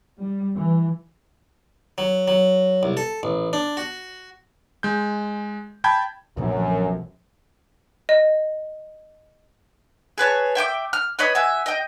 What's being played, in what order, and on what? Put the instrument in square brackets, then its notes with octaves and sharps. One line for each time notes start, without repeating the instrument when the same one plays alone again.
[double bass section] G3
E3
[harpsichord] F#3
F#3
C2
A4
A1
D4
F#4
[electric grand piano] G#3 G6
G5 A5 B5 G6 G#6
[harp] B1 F3 A3 [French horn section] F#2 [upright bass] A#2 D3
[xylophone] D#5
[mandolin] G#4 B4 C#5 A5
E5 G5 C#6 D6
F6
B4 C#5 D#5 B5
F#4 E5 G#5
D#5 G5